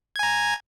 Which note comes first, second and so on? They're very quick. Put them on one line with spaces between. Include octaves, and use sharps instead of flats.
G#6 G#5 A#5